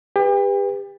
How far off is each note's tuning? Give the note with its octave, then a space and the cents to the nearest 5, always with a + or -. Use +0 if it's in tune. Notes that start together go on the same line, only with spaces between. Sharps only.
G4 +35 B4 +0